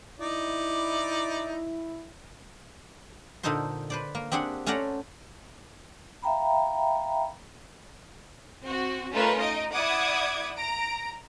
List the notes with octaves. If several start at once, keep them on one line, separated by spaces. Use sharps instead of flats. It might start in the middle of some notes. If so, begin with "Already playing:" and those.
D#4 E4 D5
A#2 D3 D#4 A4 C5 C6
B4 C5 D5
A#3
C4 D4 G4 G#4 F#5
A3 C#4 C5 D5 F#5 A#5
E5 F5 G5 A#5 B5
C4 F#4
A3 C#4 D#4 F4 A#4 B4
D#4 D#5 D7
E4 D5 F#5 D6 D#6 G#6
A#5 A#6 D7